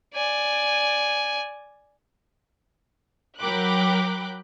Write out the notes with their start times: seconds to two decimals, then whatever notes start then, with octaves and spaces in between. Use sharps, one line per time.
0.14 D5 G#5
3.39 F#3 A#4 G5 B5 D6 F#6